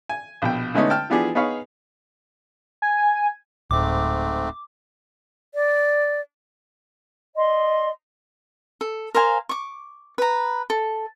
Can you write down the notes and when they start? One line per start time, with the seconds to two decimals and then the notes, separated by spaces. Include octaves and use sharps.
0.09 G#5
0.42 A#1 B2 G5
0.74 D3 G#3 A3 B3 C#4 D#4
0.90 G5 A5 F6
1.10 E3 F3 B3 D4 G4 G#4
1.35 B3 D#4 G#4 C#5 F5 B5
2.82 G#5
3.71 D1 G#2 A3 C4 D6
5.55 D5
7.35 D5 D#5 C6
8.81 A4
9.15 A#4 C5 F5 G#5
9.49 C#6 D6
10.18 B4 A#5
10.70 A4